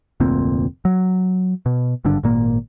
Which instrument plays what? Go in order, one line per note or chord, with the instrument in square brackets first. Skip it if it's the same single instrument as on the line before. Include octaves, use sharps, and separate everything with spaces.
[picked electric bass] F1 D2 A#2 C4
F#3
B2
G#1 G2 D3 D4
G#1 A#2 A#3